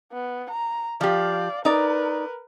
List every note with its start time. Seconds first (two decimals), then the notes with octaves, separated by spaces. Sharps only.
0.12 B3
0.50 A#5
1.01 F3 G4 D5 F5
1.65 D#4 A#4 B4 D5